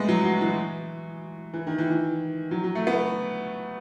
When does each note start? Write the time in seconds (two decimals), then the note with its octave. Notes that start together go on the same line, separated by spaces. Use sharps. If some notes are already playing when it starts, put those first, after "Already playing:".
Already playing: G#3 A3 B3
0.08 F#3
0.25 F#3
0.41 E3
1.54 E3
1.67 D#3
1.78 E3
1.90 E3
2.51 F#3
2.64 F#3
2.75 A3
2.87 B3